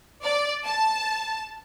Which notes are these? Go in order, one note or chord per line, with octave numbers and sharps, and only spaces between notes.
D5
A5